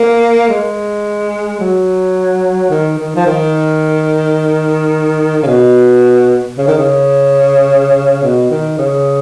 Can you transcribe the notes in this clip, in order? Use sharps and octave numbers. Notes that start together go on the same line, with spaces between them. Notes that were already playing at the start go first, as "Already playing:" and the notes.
Already playing: A#3
G#3
F#3
D#3
D#3
F3
D#3
C#3
B2
C#3
D#3
C#3
B2
D#3
C#3